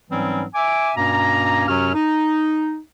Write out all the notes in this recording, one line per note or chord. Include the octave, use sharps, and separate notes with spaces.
G#2 E3 F#3 G3 C4 C#4
E5 G#5 D6
G2 B2 A#3 C#4 A#5
F#2 C3 F#3 C#4 F#4 F6
D#4